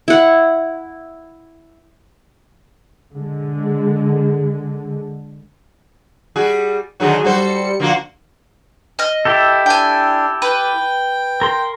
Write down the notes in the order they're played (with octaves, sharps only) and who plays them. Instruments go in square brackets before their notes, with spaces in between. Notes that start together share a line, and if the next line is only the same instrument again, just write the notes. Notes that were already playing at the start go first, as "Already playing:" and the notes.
[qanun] E4 F#5
[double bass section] D3 G#3
[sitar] G3 F#4 G#4
[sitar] D3 D#3 F#4 [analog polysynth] F#3 G#4
[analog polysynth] G3 C#7 [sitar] F#4 A4 C5
[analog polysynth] D3 F#4 F#5 [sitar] F3 A#3 F4
[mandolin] D#5 F6
[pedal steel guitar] E4 G4 A4
[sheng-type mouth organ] D4 [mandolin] G5 G#5
[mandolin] B4 [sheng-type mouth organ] G5
[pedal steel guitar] A#4 C6